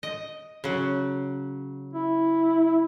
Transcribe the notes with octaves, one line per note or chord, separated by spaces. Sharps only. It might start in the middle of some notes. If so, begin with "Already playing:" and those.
D#5
C#3 F#3
E4